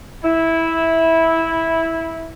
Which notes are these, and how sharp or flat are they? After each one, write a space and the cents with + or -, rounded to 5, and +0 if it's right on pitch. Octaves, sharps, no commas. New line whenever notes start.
E4 -10